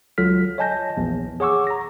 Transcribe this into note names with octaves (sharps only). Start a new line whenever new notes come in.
C#2 F#3 F4 A4 F6 B6
C#5 D#5 G#5 A5 G6 A#6
A#1 E2
G#4 C#5 F#5 C#6 D6 E6
A#5 A#6